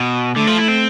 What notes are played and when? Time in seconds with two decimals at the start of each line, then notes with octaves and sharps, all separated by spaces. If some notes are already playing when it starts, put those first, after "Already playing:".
Already playing: B2
0.35 D3 A3
0.47 F3
0.57 E4
0.68 C4